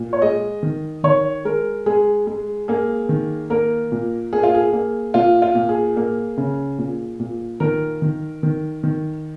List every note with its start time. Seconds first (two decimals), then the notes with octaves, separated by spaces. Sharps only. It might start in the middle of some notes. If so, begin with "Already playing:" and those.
Already playing: A#2
0.13 C#5
0.22 G#3 D#5
0.63 D#3
1.04 D#3 C#5
1.45 G#3 A#4
1.86 G#3 G#4
2.27 G#3
2.68 A#3 G#4
3.09 D#3
3.50 A#3 A#4
3.92 A#2
4.33 A#3 G#4
4.43 F4
4.55 G#4
4.73 A#3
5.14 A#2 F4
5.42 F4
5.55 A#2
5.69 G#4
5.97 A#3
6.37 C#3
6.78 A#2
7.20 A#2
7.60 D#3 A#4
8.02 D#3
8.43 D#3
8.83 D#3